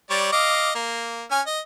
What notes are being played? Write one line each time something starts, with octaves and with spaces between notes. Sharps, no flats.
G3 C#5 D5
D#5 F5 D6
A#3
C#4 G#5 F6
D#5